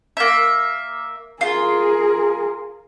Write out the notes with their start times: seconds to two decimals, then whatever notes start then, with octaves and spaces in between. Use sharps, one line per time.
0.17 A#3 E5
1.41 F4 G#4 A#4